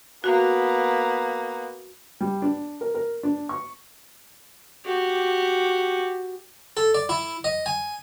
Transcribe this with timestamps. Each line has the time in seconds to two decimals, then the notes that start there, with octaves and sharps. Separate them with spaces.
0.24 A#3 B3 F#4
2.20 G3
2.42 D4
2.81 A#4
2.94 A#4
3.23 D4
3.49 C#6
4.86 F#4 G4
6.77 A4
6.95 D5
7.09 E4
7.44 D#5
7.66 G#5